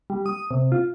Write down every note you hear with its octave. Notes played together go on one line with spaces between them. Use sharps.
G3
D#6
C3
F4